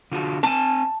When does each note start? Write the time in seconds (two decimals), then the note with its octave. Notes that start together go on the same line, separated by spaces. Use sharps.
0.12 D3 F4 F#4
0.43 C4 G#5 A5